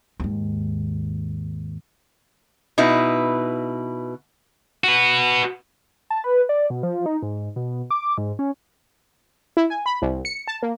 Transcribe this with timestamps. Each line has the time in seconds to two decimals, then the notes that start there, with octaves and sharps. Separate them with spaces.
0.20 D#2 G#2
2.78 B2 D#4 E4 B4
4.84 F#4 B4
6.10 A5
6.24 B4
6.49 D5
6.70 B2
6.83 F3
7.06 D#4
7.22 G#2
7.56 B2
7.91 D6
8.18 G#2
8.39 C#4
9.57 E4
9.70 G#5
9.86 B5
10.02 C2
10.25 C#7
10.47 A5
10.62 A#3